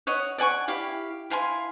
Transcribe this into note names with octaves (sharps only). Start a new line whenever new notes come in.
C#5 D#5 F#5
D5 F#5 G#5 C#6
E4 G4 F5
E4 F5 G#5 C6